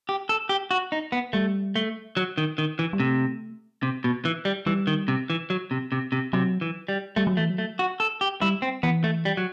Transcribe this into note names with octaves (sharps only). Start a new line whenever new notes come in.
G4
A4
G4
F#4
D#4
B3
G3 A3
A3
F#3
D#3
D#3
E3
G3
C3 A3
C3
B2
E3
G3
E3 G3
D#3
C3
E3
F#3
C3
C3
C3
C3 F#3
E3
G3
G3 A3
F#3
E3 A3
F#3
A3
F#4
A4
G4
G3 E4
C4
E3 B3
A3
G3
F#3